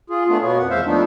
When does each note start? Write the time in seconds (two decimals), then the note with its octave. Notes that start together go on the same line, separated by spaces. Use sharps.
0.10 F4 G#4
0.28 A3 B3 D4 F4 G#4
0.42 B2 A#3 B3 C#5
0.59 F2 F#5
0.70 E2 G#3 C5 E5 F5
0.86 F3 A3 B3 D4 D#4